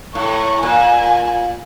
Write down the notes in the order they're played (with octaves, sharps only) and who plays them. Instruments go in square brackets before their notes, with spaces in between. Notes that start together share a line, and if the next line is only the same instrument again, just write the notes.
[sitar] A2 [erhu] C#6
[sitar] A#2 [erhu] G#5